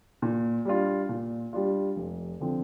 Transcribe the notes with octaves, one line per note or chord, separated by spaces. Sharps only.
A#2
G3 D4 F4
A#2
G3 D4 F4
F1
D3 F3 C4